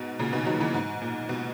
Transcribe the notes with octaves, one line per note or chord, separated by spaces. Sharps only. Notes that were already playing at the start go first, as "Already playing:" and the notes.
Already playing: G#2 B2
A#2 C#3
B2 D#3
D#3 F#3
C#3 E3
G#2
A#2
B2